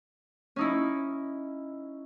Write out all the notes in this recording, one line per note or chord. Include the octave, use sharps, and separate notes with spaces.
C#4 D#4 E4